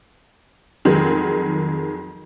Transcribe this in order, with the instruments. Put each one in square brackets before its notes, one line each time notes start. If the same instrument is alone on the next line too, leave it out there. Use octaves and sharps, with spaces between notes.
[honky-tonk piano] F2 D#3 F#3 G#3